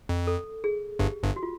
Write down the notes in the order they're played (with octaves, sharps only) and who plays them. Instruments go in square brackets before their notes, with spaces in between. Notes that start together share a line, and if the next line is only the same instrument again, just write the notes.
[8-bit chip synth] F2
[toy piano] A4
G#4
[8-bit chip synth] G1 G2 [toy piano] G4
[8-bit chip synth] G1 G2
[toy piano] F#4
F4